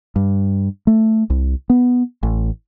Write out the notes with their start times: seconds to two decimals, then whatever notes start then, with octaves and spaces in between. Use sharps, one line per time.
0.16 G2
0.87 A3
1.30 C2
1.70 B3
2.23 A1